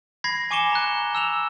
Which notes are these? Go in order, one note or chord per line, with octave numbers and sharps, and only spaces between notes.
B5 G#6 A#6 C7
G#5 C#6 D6 C#7 E7 G7
A#5 F#6
A5 E6 E7 F7